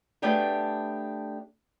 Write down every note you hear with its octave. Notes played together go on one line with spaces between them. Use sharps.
A3 B3 D4 G4 G#4